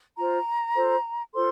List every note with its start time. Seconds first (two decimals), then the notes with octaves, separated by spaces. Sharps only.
0.17 F4 C5 A#5
0.75 F4 A4 C5
1.33 F4 A4 C5 C6